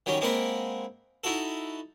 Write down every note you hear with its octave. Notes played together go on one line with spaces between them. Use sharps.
D#3 F#3 G3 C#4
G#3 A#3 C4 A#4 F#5 B5
D#4 E4 F#4 A4